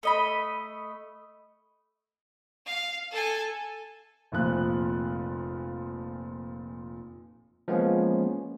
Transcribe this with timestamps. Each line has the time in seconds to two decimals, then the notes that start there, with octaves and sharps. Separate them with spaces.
0.03 A3 D#5 B5
2.66 F5
3.11 A4 G#5
4.32 F1 A#2 F3 F#6
7.68 F3 G#3 A#3 B3 C#4